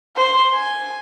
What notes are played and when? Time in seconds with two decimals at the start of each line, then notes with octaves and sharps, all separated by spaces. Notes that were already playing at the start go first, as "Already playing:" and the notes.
0.16 C5
0.54 G#5